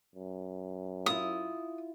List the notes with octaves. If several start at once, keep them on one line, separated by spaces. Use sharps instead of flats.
F#2
E4 F4 D#6